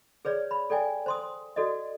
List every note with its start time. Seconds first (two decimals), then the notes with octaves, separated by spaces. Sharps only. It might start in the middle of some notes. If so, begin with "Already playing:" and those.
0.25 G#4 B4 C#5 D5
0.51 B5
0.70 A4 D5 G5 G#5
1.06 C5 C6 D#6
1.56 F#4 A4 D5 D#5